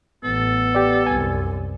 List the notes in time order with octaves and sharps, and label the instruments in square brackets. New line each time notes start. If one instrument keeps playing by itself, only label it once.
[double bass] A1 [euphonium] B3 [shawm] A4
[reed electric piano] G4 D5
[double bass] C2 F#2 [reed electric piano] G#5